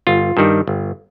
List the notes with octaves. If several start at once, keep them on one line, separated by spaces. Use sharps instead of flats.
G1 F4
G2 D#3 G3
G1